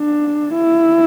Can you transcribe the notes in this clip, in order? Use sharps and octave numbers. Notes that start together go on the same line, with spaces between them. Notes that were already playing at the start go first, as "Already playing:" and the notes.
Already playing: D4
E4